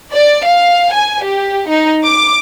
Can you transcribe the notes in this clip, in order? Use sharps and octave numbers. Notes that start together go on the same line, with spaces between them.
D5
F5
G#5
G4
D#4
D6